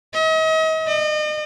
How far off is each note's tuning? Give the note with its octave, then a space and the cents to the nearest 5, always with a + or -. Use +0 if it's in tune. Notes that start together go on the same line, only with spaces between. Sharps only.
D#5 +40
D#5 -40